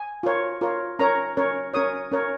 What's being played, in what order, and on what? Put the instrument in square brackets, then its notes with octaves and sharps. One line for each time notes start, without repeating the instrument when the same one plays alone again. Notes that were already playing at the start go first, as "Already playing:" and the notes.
Already playing: [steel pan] G#5
F4 A#4 C#5
F4 A#4 C#5
C#4 A#4 C#5 A#5
C#4 A#4 C#5
C#4 A#4 C#5 D#6
C#4 A#4 C#5